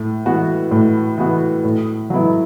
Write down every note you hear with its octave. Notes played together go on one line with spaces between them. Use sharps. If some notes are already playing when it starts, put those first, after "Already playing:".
Already playing: A2
E3 B3 F#4
A2
E3 B3 F#4
A2
F#3 B3 E4